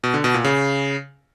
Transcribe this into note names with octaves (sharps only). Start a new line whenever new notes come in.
B2
D3
B2
A#2
C#3